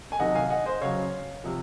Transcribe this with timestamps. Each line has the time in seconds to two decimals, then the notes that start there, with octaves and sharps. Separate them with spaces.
0.12 G#5
0.19 C3 D#3 F#3 D#5 F#5
0.35 F5 G#5
0.50 D#5 F#5
0.66 C5 D#5
0.81 C#3 F#3 C#5 F5
1.44 C3 F3